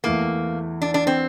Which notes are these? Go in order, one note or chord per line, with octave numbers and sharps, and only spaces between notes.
E2 E3 A3 A#3
D4
D4
C4